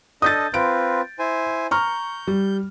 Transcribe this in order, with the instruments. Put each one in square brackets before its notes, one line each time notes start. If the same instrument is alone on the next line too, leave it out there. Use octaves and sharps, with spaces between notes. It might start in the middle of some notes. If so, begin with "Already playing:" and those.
[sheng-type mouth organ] D4 A4 D#5 [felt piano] D#6 G6 A6
[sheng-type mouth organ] C4 F4 B4 [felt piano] D7
[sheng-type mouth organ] E4 C5 G#5
[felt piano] A#5 C#6 F6 [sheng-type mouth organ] G6
[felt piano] G3